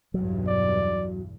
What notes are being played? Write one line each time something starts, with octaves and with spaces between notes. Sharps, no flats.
B1 E2 G2 F#3
D5